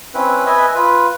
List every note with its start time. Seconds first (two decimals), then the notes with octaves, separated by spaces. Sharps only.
0.14 C4 C#4 E4 B4
0.46 B4 D#5 E5 G#5
0.75 F4 B4